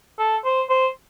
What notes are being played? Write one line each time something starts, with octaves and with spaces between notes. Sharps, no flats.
A4
C5
C5